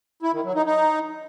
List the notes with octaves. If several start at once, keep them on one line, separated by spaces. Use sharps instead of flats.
E4
D#3
F#3
D#4
D#4